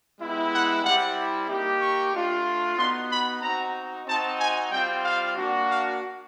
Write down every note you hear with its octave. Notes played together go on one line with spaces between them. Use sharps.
G#3 B3 E4 G4
F#5
G3 C4 E4 G4 F#5
A#3 D#4 G4
C#6
A3 D4 F4
B3 D#4 F#4 C6
B5
C4 D#4 F#4 A#5
C4 D#4 F#4 A5
G#5
G3 C4 F4 G5
F5
A#3 D4 F#4
F5